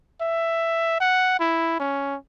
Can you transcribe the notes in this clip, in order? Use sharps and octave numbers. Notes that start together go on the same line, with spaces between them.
E5
F#5
E4
C#4